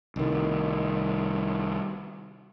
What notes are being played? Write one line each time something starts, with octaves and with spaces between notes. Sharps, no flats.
C2 D#3